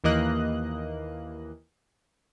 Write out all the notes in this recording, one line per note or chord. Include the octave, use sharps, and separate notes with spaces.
D#2 E3 A#3 D#5 F#6